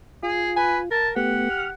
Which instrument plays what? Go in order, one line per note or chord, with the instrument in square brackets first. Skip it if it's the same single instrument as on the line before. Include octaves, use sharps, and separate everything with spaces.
[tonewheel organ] F4 [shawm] G#4
[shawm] B4 [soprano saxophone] G#5
[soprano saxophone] A#4 [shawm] A5
[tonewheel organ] A3 B3 [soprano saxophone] G4 [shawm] F#5
[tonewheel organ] F6